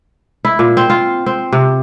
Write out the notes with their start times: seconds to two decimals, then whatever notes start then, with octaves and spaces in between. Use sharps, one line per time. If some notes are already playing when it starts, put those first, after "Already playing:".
0.45 E4
0.59 A#2
0.77 C4
0.90 F4
1.26 C4
1.52 C3